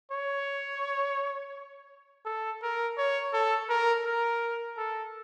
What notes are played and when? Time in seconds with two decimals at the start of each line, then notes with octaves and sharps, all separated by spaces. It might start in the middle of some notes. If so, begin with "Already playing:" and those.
0.12 C#5
2.26 A4
2.63 A#4
2.98 C#5
3.33 A4
3.70 A#4
4.06 A#4
4.78 A4